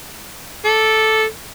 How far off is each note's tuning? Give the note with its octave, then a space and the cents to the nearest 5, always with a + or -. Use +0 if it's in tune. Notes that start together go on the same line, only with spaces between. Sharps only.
A4 -5 D6 +0